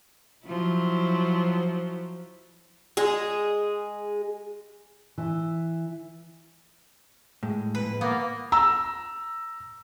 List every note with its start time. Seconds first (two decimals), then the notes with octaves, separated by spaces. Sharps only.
0.46 F3 F#3 E4
2.97 G#3 G#4
5.18 E3
7.43 A2 G#3
7.75 F2 A#2 B4
8.01 A#3 B3 E4
8.52 A#5 E6